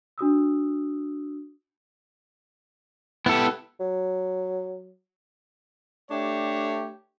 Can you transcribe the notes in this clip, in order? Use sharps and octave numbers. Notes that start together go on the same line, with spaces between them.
D4 F#4 D#6 E6
B3 E4 F4 G4 A4
F#3
A3 D4 G4 C#5